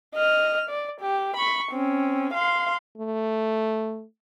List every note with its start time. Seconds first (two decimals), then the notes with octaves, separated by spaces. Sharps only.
0.15 D#5 F6
0.70 D5
1.01 G4
1.37 B5 C#6
1.72 C4 C#4
2.34 F5 C6
2.98 A3